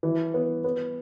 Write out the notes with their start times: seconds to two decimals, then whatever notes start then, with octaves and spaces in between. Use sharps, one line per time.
0.03 E3
0.34 B3
0.64 B3